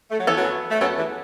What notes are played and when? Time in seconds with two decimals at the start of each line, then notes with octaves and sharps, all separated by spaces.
0.11 A3
0.19 F#3
0.27 E3 B3 A4 C#5
0.36 F#2 F#3
0.71 A3
0.81 F#2 F#3 B3 A4 C#5
0.97 E2 E3